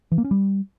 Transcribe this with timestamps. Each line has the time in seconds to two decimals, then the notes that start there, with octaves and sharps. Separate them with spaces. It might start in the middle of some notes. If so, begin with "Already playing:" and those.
0.12 E3
0.18 A#3
0.24 C#4
0.31 G3